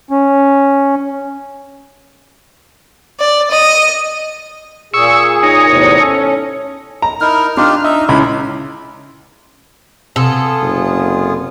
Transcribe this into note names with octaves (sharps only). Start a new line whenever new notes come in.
C#4
D5
D#5
A#2 G#4 C#6 E6
D#4 C#5
E2 A2 C3
C#4 A4
A#5
D#4 E4 A#4 F6
D4 D#4 F4 G4
D#4 E5
C#2 E4 B5
C3 B3 F4 G#4 A4
F#1